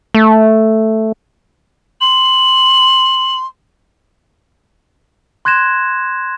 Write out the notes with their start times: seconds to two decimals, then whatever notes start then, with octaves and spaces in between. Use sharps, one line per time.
0.15 A3
2.01 C6 F#7
5.45 C6 F#6 G#6 A#6 E7